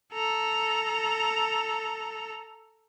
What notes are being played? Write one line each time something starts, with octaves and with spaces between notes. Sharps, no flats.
A4 A#5